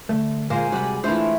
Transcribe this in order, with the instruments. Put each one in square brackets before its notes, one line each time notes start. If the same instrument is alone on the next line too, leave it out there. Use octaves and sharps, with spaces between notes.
[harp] D3 [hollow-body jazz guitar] A3
[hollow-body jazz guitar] A#2 A#3 [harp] G#3 A#5 [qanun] A#4 C5 [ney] G#5
[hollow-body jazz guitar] C3 G3 F#4 [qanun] D5 B5
[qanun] E3 A3 [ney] D4 [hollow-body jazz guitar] F4 C5